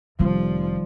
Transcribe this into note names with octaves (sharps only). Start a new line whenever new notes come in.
F1 D#3 F3 G3 C4